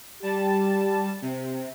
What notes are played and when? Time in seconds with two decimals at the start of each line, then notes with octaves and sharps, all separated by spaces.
0.23 G3 G4 A5
1.22 C3